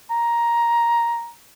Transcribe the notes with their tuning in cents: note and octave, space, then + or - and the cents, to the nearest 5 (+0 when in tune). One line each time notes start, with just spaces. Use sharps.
A#5 +10